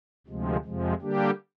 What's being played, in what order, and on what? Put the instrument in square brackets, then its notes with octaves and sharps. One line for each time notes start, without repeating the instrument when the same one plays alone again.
[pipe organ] D2 C3 F3 G#3
F2 C3 F3 G#3
D3 G3 A#3 D4 G4